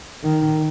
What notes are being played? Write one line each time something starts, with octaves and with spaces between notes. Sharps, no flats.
D#3